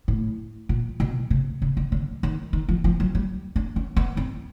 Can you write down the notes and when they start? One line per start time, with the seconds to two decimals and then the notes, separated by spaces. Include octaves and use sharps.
0.08 A2
0.69 A#2
1.00 B2
1.30 C3
1.62 C#3
1.77 D3
1.92 D3
2.23 D#3
2.53 D#3
2.69 F3
2.84 F3
3.00 F#3
3.15 G3
3.56 D4
3.76 C#4
3.96 B3
4.17 C4